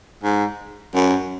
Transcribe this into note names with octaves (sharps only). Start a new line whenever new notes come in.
G#2
F#2